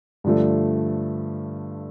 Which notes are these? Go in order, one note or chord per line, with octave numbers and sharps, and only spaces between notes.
G2 D3 F3 A3